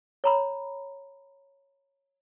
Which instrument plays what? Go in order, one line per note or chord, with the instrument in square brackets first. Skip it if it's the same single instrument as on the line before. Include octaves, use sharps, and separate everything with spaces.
[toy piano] C#5 A#5 B5